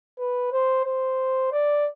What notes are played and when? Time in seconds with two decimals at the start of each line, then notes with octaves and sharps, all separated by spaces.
0.18 B4
0.52 C5
0.85 C5
1.52 D5